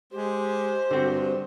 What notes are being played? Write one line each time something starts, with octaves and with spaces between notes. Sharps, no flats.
G#3 G4 C5
G2 D3 C4 F#4